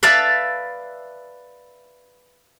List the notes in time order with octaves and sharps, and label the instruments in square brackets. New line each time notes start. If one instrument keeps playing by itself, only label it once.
[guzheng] B4 D5 E5 F5 A5 B5